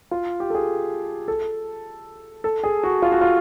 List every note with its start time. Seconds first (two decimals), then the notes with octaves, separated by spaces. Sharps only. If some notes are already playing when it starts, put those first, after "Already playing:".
0.11 F4
0.40 G4
0.50 A4
0.55 G#4
1.28 A4
2.44 A4
2.63 G#4
2.83 F#4
3.02 F4
3.12 F#4
3.21 F4